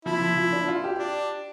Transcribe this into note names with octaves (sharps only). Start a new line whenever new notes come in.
F3 E4
F3
F3
D4
F4
G4
D4